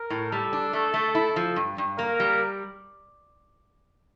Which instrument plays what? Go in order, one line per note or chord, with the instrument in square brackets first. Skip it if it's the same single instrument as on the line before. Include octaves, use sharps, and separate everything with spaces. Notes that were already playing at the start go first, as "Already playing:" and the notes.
Already playing: [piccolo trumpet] A#4
[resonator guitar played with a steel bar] A2
[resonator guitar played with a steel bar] G3 [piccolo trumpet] A4
[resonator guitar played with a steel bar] D4
[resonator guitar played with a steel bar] A3 [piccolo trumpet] A4
[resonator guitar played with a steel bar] A3
[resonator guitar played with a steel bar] E4 [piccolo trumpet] A4
[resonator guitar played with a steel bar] F3
G2
G2
[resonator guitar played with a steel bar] A#3 [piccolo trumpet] A#4
[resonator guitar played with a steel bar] G3